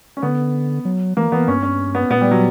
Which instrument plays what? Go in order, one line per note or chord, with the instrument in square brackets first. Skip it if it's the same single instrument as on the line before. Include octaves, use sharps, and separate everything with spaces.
[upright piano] C#4
[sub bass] D3 [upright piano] B3
[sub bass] F#3
[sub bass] E3 [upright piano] A#3
[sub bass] E3 [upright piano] B3
[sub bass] G2 [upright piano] C#4
[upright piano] C#4
B3
[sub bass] A#2 [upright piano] B3
[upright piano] G3
F#3